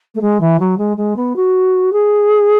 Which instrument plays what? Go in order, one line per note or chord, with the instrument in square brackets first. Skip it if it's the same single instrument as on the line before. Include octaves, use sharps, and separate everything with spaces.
[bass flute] A3
G#3
E3
F#3
G#3
G#3
B3
F#4
G#4